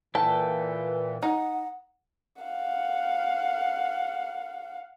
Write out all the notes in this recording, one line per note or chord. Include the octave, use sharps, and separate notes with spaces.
A#2 E3 A4 B4 G5 A5
D#4 F#5
F5 F#5